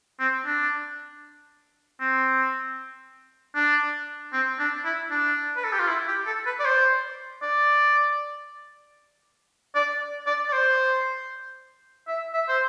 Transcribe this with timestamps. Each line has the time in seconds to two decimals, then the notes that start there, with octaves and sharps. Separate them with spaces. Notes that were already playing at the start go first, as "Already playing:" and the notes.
0.20 C4
0.46 D4
2.00 C4
3.55 D4
4.33 C4
4.59 D4
4.85 E4
5.11 D4
5.56 B4
5.64 A4
5.72 G4
5.80 F4
5.88 E4
6.07 G4
6.26 A4
6.46 B4
6.60 D5
6.65 C5
7.42 D5
9.75 D5
10.27 D5
10.48 D5
10.53 C5
12.08 E5
12.33 E5
12.48 C5